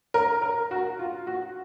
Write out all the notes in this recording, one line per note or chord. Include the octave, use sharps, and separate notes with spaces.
A#4
A#4
F#4
F4
F#4